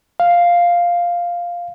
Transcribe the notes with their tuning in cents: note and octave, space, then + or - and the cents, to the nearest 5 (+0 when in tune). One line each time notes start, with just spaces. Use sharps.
F5 +0